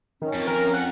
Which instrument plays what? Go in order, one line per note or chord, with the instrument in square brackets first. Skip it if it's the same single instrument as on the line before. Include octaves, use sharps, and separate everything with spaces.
[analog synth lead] D#3 [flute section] C#4
[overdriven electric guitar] F2
[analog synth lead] A#4
F#5